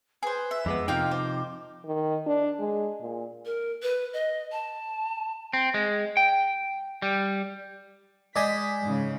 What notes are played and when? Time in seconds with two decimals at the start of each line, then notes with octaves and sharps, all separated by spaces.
0.23 G#4 B4 C5
0.51 E5
0.66 F2 G#3 B3 D6
0.88 C3 F3 A#3 D#4 F5 G5
1.11 C5
1.85 D#3
2.26 D4
2.59 G#3
3.01 A#2
3.45 A#4
3.82 B4
4.13 D#5
4.52 A5
5.53 C4
5.74 G#3
6.17 G5
7.02 G3
8.36 G#3 C5 D5 D#5 G#5 B6
8.81 G#2 C#3